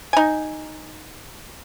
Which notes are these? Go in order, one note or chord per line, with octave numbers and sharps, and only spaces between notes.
D#4 G#5